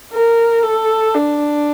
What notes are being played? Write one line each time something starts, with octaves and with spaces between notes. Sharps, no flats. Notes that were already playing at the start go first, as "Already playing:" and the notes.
A#4
A4
D4